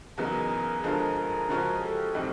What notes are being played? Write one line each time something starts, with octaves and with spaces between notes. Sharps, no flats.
E2 C#3 F#3 B3 D#4 G#4 A#4
G2 D3 F3 G#3 G#4 A#4
G#4 A#4
C#3 F3 G#3 C#4 F#4
G4 A4
A2 E3 G3 C4 D#4